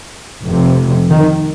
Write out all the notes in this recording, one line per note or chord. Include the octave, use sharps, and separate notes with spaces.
F1 F2 C3
D#3